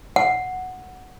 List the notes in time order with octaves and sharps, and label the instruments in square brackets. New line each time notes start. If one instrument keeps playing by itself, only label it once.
[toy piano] F#5